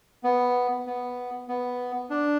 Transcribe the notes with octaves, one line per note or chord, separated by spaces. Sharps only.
B3
B3
B3
D4